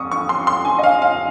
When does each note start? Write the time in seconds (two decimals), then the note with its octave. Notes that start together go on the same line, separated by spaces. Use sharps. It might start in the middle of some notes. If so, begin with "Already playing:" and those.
Already playing: F2 C#6 D#6
0.11 C#6
0.29 C6
0.47 C6
0.65 G#5
0.79 D#5
0.83 F5
1.02 F5